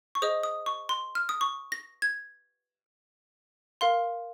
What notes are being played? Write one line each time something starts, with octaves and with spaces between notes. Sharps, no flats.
C#6
G#4 C5 D#5 D#6
D#6
C#6
C6
F6
D#6
C#6
A#6
G#6
A#4 F5 C6